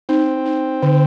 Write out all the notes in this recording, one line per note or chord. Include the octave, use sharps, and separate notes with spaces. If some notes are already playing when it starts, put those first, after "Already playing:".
C4 D#4
D#4
D3